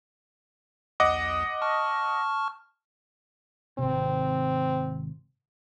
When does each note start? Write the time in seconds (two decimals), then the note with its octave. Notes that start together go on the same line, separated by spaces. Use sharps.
1.00 B1 E2 D#5 F#5 D6
1.62 A5 C#6 F6
3.79 G#1 C3 C4